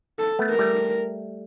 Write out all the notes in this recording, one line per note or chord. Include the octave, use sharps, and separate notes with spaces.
A4
A3 B3
A#4
G3 A3